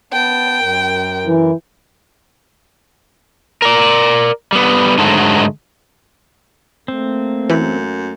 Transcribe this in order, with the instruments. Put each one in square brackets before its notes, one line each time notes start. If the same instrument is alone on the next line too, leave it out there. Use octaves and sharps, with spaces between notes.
[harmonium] B3 A5 [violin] G5
[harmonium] F#2 A#4
[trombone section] E3
[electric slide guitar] A#4 D5
G3 B3
G#2 D3 D#3 F#3 G#3 A3
[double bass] A3 A#3 [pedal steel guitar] C4
[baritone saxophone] F#2 [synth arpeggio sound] E3